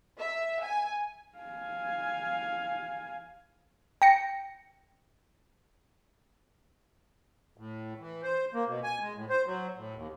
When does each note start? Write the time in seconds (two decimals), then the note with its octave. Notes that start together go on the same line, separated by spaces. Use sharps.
0.19 E5
0.64 G#5
1.38 F5 G#5
4.02 G5 A#6 C#7
7.58 A2
8.00 E3
8.23 C5
8.54 A#3
8.68 B2
8.84 G#5
9.01 G#3
9.15 A2
9.29 C5
9.46 F#3
9.77 A2
9.95 D#2